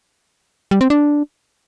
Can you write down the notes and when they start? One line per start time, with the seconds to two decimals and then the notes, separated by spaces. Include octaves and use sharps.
0.71 G3
0.81 C4
0.90 D4